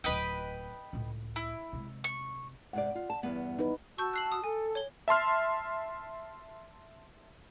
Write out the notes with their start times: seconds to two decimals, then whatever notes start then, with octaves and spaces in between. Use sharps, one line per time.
0.04 D1 E4 B4 D#5 G5
0.93 C#2 A2
1.36 E4
1.73 C3 G#3
2.04 C#6
2.73 G#2 C3 D5 F#5
2.95 F4
3.10 A5
3.23 E2 G2 B3
3.59 D#4 B4
3.98 F#4 A5 C#6 E6 G6
4.13 F#6 C7 F#7
4.32 D#6
4.44 A4 G#5
4.75 C#5 G7
5.08 E5 A5 C6 F6